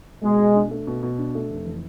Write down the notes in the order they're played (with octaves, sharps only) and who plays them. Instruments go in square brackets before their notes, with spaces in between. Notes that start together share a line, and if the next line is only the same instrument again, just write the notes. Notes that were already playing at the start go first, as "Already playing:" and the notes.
[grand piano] B2 [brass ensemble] G#3
[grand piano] B2
D4
A3
B2
B2
D4
A3
F1
E3